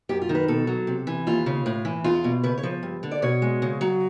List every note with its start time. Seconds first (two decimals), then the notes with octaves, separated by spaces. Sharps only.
0.09 F#2 G4
0.22 F4
0.29 D#3
0.35 B4
0.48 B2 A4
0.67 F#3
0.87 C3
1.07 E3
1.27 D#2 F4
1.46 C#3
1.66 A2
1.85 E3
2.04 E2 F4
2.24 B2
2.43 C#3 B4
2.58 C#5
2.63 F3
2.83 G2
3.03 D3
3.11 D5
3.22 B2 C#5
3.42 G#3
3.62 C#3
3.81 F#3